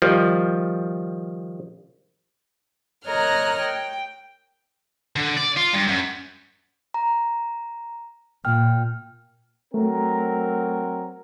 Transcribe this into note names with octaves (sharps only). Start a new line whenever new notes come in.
D#3 F3 G3
A#4 C#5 D#5 A#5 F6 F#6
G5
D3
D5
F4
G2
F#2
A#5
A#2 G5 F6
F#3 A3 C4 A#4